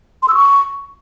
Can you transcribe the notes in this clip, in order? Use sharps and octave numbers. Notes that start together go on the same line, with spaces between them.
C6
E6
C#6